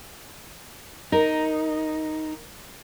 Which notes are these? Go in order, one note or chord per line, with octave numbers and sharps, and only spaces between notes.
D#4 A#4